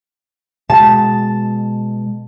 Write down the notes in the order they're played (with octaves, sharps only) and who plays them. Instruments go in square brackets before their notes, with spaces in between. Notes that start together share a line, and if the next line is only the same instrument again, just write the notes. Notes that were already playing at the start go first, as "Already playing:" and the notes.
[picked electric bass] B2 G#3 [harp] A5